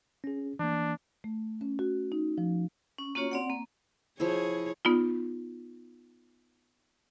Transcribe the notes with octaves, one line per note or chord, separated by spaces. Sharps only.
C#4 G#4
E3 A#3 D4
A3
C#4
F#4
D#4
F3
C#4
A#3 C#4 F4 F#4 C#5
C4 D5 F#5
A#3
F3 E4 G#4 C#5
B3 D#4 F4